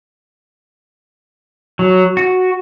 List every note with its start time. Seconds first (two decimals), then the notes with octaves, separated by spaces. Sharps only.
1.79 F#3
2.17 F#4